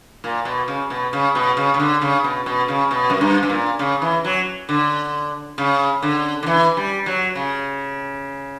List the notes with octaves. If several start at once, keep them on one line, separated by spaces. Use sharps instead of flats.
A#2
B2
C#3
B2
C#3
B2
C#3
C#3
D3
C#3
B2
B2
C#3
B2
F#2
G2
G2
A#2
C#3
E3
F#3
D3
C#3
D3
D3
E3
G3
F#3
C#3